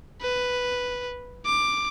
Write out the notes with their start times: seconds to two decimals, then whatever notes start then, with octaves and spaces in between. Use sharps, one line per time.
0.21 B4
1.46 D6